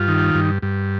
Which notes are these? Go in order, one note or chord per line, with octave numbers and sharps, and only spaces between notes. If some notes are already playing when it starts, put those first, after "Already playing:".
Already playing: G2 F4
D#3
G2
G2